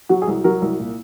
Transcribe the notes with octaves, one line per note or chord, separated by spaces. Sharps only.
F#3 F#4
G#4
C2
F#3 A#4
C2
A#2